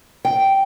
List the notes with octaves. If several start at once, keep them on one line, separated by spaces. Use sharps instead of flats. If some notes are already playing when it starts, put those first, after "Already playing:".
G5